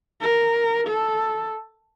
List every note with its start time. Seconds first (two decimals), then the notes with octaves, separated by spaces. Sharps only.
0.21 A#4
0.88 A4